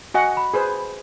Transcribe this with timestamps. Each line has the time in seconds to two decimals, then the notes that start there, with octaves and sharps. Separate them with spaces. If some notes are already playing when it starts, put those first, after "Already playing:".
0.14 F#4 D#5 F#5 G#5
0.37 B5
0.54 G#4 B4 C5